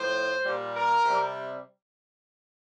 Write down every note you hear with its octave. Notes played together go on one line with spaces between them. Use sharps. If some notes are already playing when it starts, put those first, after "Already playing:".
Already playing: A2 F3 C5
A#2 G3
A#4
C3 G3